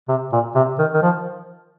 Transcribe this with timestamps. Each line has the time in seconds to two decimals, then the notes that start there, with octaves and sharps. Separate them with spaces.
0.08 C3
0.32 A#2
0.55 C3
0.79 D#3
0.94 D#3
1.02 F3